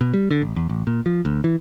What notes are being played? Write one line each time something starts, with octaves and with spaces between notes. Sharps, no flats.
B2
G3
D3
A1
E2
A1
A#2
F3
D2
E3